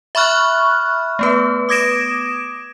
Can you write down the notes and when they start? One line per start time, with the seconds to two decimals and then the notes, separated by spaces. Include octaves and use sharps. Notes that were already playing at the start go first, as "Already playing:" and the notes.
0.15 E5 B5 C#6 F6 F#6
1.19 A3 B3 B4
1.69 D6 D#6 G#6 A#6 D7 E7